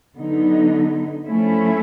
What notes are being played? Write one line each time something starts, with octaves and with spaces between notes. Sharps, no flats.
D3 F#3 B3 D#4
F3 A3 C#4 E4